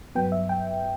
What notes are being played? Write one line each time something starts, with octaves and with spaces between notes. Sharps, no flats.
G2 F#3 B3 G5
E5
G5